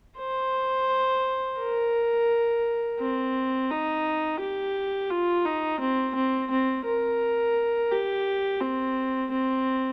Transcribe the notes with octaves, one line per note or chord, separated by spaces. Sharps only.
C5
A#4
C4
D#4
G4
F4
D#4
C4
C4
C4
A#4
G4
C4
C4